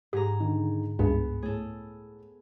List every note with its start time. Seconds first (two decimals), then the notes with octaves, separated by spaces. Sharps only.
0.13 G#2 G4 G#4 A#5
0.40 D3 D#3
0.99 C#2 G2 B3 G#4
1.43 A2 G#4 A4